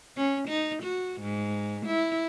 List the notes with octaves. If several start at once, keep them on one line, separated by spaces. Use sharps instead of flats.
C#4
D#4
F#4
G#2
E4